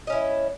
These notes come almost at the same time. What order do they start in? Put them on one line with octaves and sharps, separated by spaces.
D#5 C#4 E4